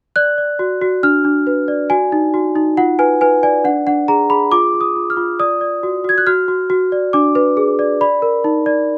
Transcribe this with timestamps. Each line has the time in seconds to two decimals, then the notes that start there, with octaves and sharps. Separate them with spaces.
0.16 D5 F#6
0.38 D5
0.59 F#4
0.81 F#4
1.03 D4 F6
1.25 D4
1.47 B4
1.68 D5
1.90 F#4 G#5
2.12 D#4
2.34 F#4
2.56 D#4
2.77 F4 F#5
2.99 B4 G#5
3.21 B4 G#5
3.43 D5 G#5
3.64 D4 F#5
3.87 D4 F#5
4.08 G#4 A#5
4.30 G#4 B5
4.52 F4 D6
4.74 F4
4.81 D#6
4.96 F4
5.10 F6
5.17 F4
5.40 D5 D#6
5.61 D5
5.83 F#4
6.04 F#4 G#6
6.18 F#6
6.27 F#4 F6
6.48 F#4
6.70 F#4
6.92 D5
7.13 D4 D6
7.35 B4
7.57 G#4
7.79 D5
8.01 D5 B5
8.22 A#4
8.44 D#4
8.66 D5